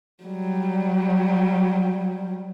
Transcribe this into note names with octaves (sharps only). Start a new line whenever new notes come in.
F#3 G3